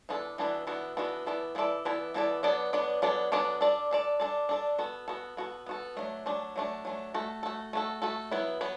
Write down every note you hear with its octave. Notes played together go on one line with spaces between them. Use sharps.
E3 B3 D4 F#4 A4
E3 B3 D4 F#4 A4
E3 B3 D4 F#4 A4
E3 B3 D4 F#4 A4
E3 B3 E4 A4 D5
E3 B3 E4 A4 D5
E3 B3 E4 A4 D5
E3 B3 E4 A4 D5
F#3 B3 D4 A4 D5
F#3 B3 D4 A4 D5
F#3 B3 D4 A4 D5
F#3 B3 D4 A4 D5
D4 A4 D5
D4 A4 D5
D4 A4 D5
D4 A4 D5
B3 F#4 A4
B3 F#4 A4
B3 F#4 A4
B3 F#4 A4
F#3 A3 D4
F#3 A3 D4
F#3 A3 D4
F#3 A3 D4
A3 F#4 A4
A3 F#4 A4
A3 F#4 A4
A3 F#4 A4
F#3 B3 E4 B4
F#3 B3 B4